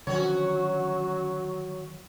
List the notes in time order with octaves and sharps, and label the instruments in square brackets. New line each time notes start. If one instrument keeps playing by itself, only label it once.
[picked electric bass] D3 D#3 F3 [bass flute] F#3 [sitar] C#4 F#4 C#5